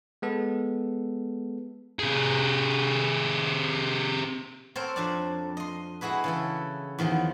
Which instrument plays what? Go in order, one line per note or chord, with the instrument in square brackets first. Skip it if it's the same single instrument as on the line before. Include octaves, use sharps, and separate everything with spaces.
[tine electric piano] G#3 B3 A4
[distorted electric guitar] C3 G#4
[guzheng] C4 A4 A#4 C5 C#5
F2 D4 D5
D#5 C6
G#3 E4 F#4 G#4 B4
C#3 E3 A4
E2 D#3 F3 F#3